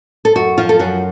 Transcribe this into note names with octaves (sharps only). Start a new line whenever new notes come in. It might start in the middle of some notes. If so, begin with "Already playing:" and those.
A4
F#2 F#4
F3 F4
A4
F#2 F#4